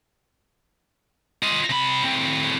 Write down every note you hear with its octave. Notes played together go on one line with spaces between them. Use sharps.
F4 D#5
C3 B5
A2 C4